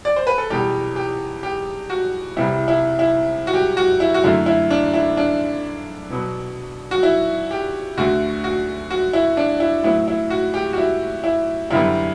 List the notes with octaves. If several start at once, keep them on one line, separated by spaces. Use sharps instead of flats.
D5
C5
B4
A4
E2 B2 G3 G4
G4
G4
F#4
C2 C3 G3 B3 E4
E4
E4
F#4
G4
F#4
E4
F#4
F#2 D3 A3 E4
E4
D4
E4
D4
B2 F#3 B3
F#4
E4
G4
D2 D3 A3 F#4
F#4
F#4
E4
D4
E4
A2 F#3 B3 E4
E4
F#4
G4
F#4
E4
E4
F#2 D3 G3 B3 E4